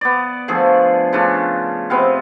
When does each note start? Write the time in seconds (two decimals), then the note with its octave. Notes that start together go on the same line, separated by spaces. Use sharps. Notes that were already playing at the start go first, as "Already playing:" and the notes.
0.01 B3 D5
0.48 D3 F3 A3 G#4
1.13 C#3 A3 D4 F4
1.90 C3 B3 C4 F5